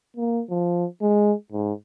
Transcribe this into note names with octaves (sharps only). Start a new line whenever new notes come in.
A#3
F3
G#3
G#2